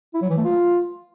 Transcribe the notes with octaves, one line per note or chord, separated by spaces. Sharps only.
E4
F#3
E3
A3
F4